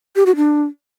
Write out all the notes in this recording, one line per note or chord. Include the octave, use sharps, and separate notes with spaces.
G4
F#4
D4